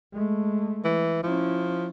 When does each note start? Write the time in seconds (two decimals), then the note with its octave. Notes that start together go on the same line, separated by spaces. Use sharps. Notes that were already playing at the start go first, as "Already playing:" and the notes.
0.13 G#3 A3
0.84 E3
1.23 F3 C#4 E4